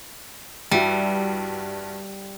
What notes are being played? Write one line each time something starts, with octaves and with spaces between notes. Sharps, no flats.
G2 G3 E4 F#4